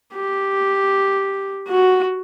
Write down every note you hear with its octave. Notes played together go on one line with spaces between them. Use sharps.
G4
F#4